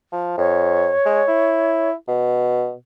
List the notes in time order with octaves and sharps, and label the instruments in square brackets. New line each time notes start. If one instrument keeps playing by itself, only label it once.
[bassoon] F3
[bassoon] F2 [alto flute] C#5
[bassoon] G#3
E4
B2